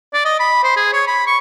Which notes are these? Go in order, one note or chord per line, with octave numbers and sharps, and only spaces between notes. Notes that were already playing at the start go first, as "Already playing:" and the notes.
D5
D#5
B5
C5
G#4
C#5
B5
C#6